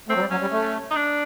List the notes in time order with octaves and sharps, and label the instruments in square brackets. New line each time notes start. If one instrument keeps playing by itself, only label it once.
[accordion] A3 [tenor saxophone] C4
[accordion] F#3
G3
[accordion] F#3 [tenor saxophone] C#4
[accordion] G3
A3
[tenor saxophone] D#4
D4